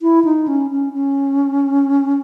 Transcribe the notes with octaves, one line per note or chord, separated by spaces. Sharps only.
E4
D#4
C#4
C#4
C#4